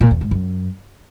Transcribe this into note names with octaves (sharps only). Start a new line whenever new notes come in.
A#2
E2
G#2
F#2